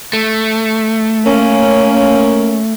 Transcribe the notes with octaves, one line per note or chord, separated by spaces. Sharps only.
A3
A#3 C#4